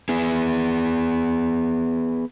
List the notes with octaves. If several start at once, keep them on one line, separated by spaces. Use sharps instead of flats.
B3 G#4